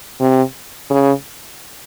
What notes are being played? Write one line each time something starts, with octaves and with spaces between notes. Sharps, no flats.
C3
C#3